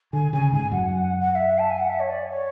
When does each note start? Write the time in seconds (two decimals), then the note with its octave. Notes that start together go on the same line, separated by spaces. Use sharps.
0.13 D3 G#5
0.33 C#3 G#5
0.52 G#2 G#5
0.72 F#2 F#5
1.20 F#5
1.31 F#5
1.35 E5
1.58 A5
1.69 G#5
1.79 F#5
1.89 E5
1.99 C#5
2.09 D5
2.29 C#5